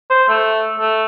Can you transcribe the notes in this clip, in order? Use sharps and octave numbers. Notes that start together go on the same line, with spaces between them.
C5
A3
A3